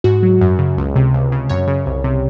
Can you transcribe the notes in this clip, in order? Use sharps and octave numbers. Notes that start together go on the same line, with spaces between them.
G#2 F#4
F#3
F#2
C#3
C#2
C3
C#2
C#3
F#2 C#5
C#3
C2
C3